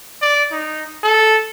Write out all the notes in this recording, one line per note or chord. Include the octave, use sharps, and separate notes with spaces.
D5
D#4
A4